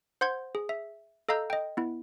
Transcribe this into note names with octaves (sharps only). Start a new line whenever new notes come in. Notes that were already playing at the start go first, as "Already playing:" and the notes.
C5 F#5 C6 G6 G#6
G#4
E5
A4 D#5 F5 A#5 E6 G6
D#5 G5
B3 E4